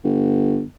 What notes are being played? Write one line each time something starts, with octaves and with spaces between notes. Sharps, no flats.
G1